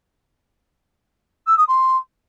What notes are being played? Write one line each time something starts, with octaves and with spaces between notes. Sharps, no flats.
E6
D#6
C6